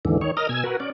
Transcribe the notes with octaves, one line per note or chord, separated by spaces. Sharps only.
D#2 G#2 D3 E3
D#3 C#5
A#4 D#5 D#6 F6
B2 G#5 E6 G#6
F#4 A#4 B4
C#4 D5